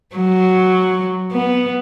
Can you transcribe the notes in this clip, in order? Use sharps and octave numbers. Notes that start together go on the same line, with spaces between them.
F#3
B3